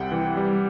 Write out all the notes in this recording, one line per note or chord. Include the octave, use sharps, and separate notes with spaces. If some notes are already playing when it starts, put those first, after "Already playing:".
Already playing: C2 C3 G3 F#5 G5
E3
G3